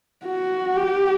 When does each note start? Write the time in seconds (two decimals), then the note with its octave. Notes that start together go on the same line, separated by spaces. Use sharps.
0.25 F#4
0.77 G4